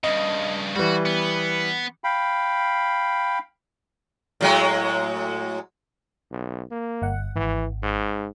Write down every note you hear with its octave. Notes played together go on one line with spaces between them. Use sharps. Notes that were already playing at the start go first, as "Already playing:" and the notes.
G2 C#3 D#5
E3 G3 F#4
B3
F5 G5 B5
A2 F#3 G#3
B1
A#3
G1 F#5
G#1 E3
G#2